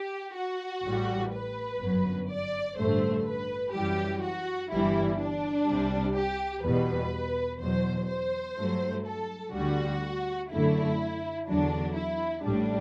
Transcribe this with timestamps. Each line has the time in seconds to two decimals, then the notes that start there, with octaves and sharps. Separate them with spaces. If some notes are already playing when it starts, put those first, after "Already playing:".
Already playing: G4
0.35 F#4
0.85 A1 A2 G3
1.32 B4
1.80 G1 F#2 F#3
2.30 D5
2.77 A1 G2 D3 A3 C5
3.25 B4
3.74 F#2 E3 G3 G4
4.23 F#4
4.71 G1 G2 E3 G3 E4
5.20 D4
5.68 C2 C3 G3
6.15 G4
6.64 E2 B2 G3 B4
7.60 E2 B2 F#3 C5
8.09 C5
8.57 G2 F#3 A3
9.06 A4
9.54 D2 D3 G3 F#4
10.50 F#2 D3 A3 E4
11.47 E2 D3 F#3 D4
11.95 E4
12.44 A1 A2 G3 D4